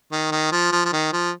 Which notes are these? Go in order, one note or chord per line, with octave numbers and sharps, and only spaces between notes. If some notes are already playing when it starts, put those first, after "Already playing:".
D#3
D#3
F3
F3
F3
D#3
F3